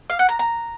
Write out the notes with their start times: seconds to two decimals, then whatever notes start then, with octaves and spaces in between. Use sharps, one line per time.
0.10 F5
0.19 F#5
0.29 A#5
0.39 A#5